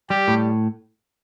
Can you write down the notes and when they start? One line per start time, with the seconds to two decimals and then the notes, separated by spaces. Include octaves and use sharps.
0.10 G3 G4
0.28 A2